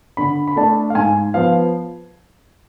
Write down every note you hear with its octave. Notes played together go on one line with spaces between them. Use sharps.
D3 B5
B5
A3 D4 A5
F5
G#2 G#5
F3 B3 F5